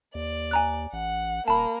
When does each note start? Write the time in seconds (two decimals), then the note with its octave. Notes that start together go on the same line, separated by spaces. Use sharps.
0.15 D#2 D5
0.51 G#5 A#5 F#6
0.93 A1 F#5
1.48 D#1 A#3 A5 B5